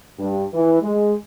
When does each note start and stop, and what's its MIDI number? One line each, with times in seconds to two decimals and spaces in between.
0.19 0.44 43
0.54 0.80 52
0.82 1.15 56